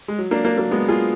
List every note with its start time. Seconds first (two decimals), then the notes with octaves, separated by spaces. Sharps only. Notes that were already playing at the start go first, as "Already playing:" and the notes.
0.08 G#3
0.18 F#3
0.31 A#3 D4
0.45 A#3 D4
0.58 F#3 A#3
0.71 G#3 B3
0.88 F4 G#4